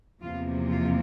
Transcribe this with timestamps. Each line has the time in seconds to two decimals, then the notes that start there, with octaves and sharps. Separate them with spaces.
0.21 E2 C3 F3 A#3 F4
0.69 F4